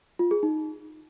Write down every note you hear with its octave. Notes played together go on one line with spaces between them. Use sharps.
F4
G#4
D#4